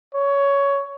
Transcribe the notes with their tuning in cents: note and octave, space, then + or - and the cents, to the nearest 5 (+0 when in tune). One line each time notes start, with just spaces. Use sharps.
C#5 +15